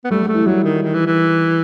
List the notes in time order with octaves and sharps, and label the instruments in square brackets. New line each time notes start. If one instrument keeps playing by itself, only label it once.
[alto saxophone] B3
[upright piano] G3 [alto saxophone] A3
[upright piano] G3
[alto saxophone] A3
[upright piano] E3 E4
[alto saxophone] F#3 [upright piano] G3
[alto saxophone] D#3
D#3
E3
E3